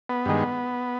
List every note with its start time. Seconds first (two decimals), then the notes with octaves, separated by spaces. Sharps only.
0.09 B3
0.26 G2 D#3 G#3